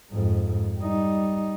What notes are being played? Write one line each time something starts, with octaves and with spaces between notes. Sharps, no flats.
F2 G#2
G3 D#4